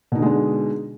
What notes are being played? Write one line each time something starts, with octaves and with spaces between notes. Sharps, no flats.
B2 D3 G#3 D4 D#4